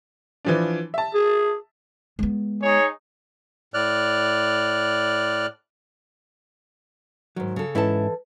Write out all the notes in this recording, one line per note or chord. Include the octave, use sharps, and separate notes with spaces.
E3 F3 D4
E5 A5
G#4
G#3 B3
D#4 G#4 C#5
A2 D5 F6 F#6
G#2 D#3 F#3
C#3 A4
G#2 E3 C#4 E4 A4 A5